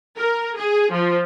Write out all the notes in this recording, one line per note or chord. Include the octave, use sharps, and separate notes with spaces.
A#4
G#4
F3